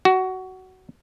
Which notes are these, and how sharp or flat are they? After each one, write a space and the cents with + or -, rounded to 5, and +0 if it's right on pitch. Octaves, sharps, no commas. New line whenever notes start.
F#4 +15